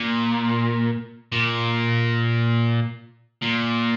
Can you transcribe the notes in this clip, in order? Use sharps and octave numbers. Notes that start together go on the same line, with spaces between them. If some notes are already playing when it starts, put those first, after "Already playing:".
Already playing: A#2
A#2
A#2